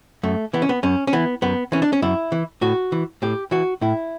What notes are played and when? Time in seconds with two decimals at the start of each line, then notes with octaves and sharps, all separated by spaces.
0.23 F#2 A3
0.53 E3 B3
0.62 C#4
0.69 B3
0.83 F#2 C#4
1.07 C#4
1.13 E3 B3
1.42 F#2 B3
1.72 E3 C#4
1.82 D4
1.93 C#4
2.02 F#2 E4
2.32 E3
2.61 A2 F#4
2.92 E3
3.22 A2 G4
3.51 E3 F#4
3.81 A2 E4